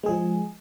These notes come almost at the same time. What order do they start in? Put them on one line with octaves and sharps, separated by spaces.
G#3 G#4 F3